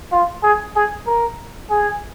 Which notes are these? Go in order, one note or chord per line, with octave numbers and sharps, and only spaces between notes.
F4
G#4
G#4
A#4
G#4